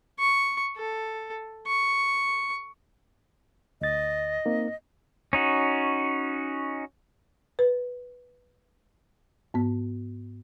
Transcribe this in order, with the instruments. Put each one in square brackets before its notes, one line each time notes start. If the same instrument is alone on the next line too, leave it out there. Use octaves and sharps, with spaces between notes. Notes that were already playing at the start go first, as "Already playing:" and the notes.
[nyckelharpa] C#6
A4
C#6
[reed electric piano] D2 A6 [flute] D#5
[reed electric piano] A#3 C4 D#4
[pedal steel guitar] C#4 D#4 F#4
[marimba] B4
G#2 B3